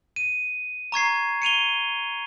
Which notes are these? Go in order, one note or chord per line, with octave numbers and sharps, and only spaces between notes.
D#7
A#5 C#6 G#6 C7
C#7 D#7 F7 G7